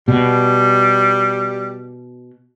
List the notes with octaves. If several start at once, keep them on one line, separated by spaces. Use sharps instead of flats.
B2 G3